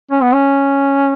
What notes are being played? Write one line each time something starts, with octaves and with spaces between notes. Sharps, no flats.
C#4
B3
C#4